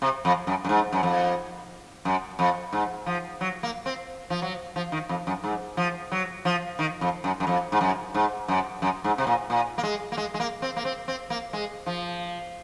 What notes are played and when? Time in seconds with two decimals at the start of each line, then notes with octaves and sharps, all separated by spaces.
0.02 C3
0.25 F2
0.47 F#2
0.65 F#2
0.69 G#2
0.92 F#2
1.03 F2
2.05 F#2
2.39 F2
2.73 G#2
3.06 F3
3.41 F#3
3.63 A#3
3.86 C4
4.30 F3
4.42 F#3
4.76 F3
4.92 D#3
5.09 F2
5.27 F#2
5.44 G#2
5.77 F3
6.12 F#3
6.45 F3
6.79 D#3
7.01 F2
7.24 F#2
7.40 F#2
7.47 F2
7.72 G#2
7.81 F#2
8.15 G#2
8.48 F#2
8.82 F#2
9.04 G#2
9.18 C3
9.27 A#2
9.50 A#2
9.78 A#3
9.83 G#3
10.12 A#3
10.17 G#3
10.34 G#3
10.40 A#3
10.62 C4
10.76 A#3
10.85 C4
11.08 C4
11.30 A#3
11.53 G#3
11.86 F3